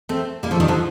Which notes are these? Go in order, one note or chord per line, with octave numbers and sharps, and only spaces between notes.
A3 C4
G3 A#3
F3 A3
D#3 G3
D3 F3